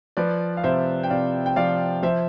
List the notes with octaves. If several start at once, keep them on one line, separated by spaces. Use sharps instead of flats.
F3 B4 D5
F5
C3 C5 E5
G5
C3 D5 F5
G5
F3 D5 F5
F3 C5 E5